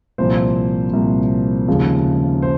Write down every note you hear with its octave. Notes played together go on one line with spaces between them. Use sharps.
C2 A#2 F3 C5
C2 A#2 F3
D#2 C#3 F3 G#3
C5